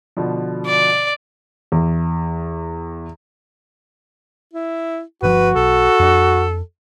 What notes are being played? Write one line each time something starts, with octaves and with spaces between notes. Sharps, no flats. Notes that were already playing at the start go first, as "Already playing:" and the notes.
B2 D3 F3
D5
E2
E4
G1 C#3 F3 F#4 B4
B1 A4
F2 D4